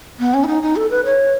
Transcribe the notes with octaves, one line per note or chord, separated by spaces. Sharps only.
B3
C#4
E4
D#4
D#4
A4
B4
C#5